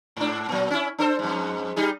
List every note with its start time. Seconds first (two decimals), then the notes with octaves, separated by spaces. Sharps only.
0.17 G#2 D4
0.49 A#2 F#3
0.70 C#4 E4
0.98 D4 A4 C5
1.19 F2 G#2
1.76 G3 D#4 G#4